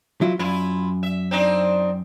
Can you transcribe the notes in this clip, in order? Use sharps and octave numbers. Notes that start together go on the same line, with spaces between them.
F#3 E4 F4
F#2 E4 F4
E5
C4 D4 D#4